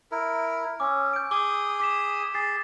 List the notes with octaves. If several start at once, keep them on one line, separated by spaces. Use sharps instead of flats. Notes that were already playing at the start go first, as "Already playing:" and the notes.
E4 A#4
C#4 D6 E6
G6 D7
G#4 D6 D#6 G7
D6 B6 E7
G#4 A6 C7